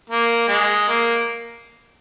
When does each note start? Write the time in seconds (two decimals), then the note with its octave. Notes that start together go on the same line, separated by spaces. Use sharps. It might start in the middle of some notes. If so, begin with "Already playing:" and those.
0.10 A#3
0.48 G#3
0.88 A#3